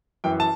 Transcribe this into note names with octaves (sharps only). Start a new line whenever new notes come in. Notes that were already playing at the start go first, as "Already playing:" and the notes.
F#2 E3 G5
A5